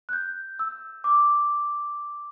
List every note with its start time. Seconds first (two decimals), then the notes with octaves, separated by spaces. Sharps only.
0.09 F#6
0.13 G6
0.59 E6
1.04 D6